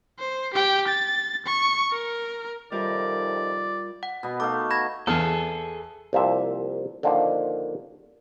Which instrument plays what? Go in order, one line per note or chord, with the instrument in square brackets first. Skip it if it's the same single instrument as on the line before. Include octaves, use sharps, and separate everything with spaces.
[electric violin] C5
G4 G5
A6
C#6
A#4
[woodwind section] F2 C3 D#3 [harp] G3 F4 A#4 [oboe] D5
[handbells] F#5
[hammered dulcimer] B2 B3
[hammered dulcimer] A3 D#4 F5 [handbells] D6
[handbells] B5 G#6 A#6
[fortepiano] E2 F6 [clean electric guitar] G#4 A4
[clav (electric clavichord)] C2 F3 A#3 E5
D3 D#3 F3 A#3